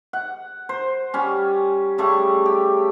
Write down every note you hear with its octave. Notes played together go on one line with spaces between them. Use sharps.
F#5
C5
G3 C#4
C#3 G3 A3 C#6
G4